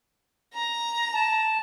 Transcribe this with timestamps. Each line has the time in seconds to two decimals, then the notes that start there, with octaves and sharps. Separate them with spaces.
0.54 A#5
1.15 A5